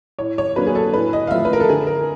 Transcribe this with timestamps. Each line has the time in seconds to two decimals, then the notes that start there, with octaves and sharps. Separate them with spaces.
0.19 A2 C#5
0.38 C#5
0.56 F#3 A#3 D4 B4
0.67 G#4
0.75 A4
0.93 A2 B4
1.13 D#5
1.27 F5
1.31 F3 A3 E5
1.45 B4
1.53 A#4
1.60 A4
1.69 D3 G#4
1.87 A#4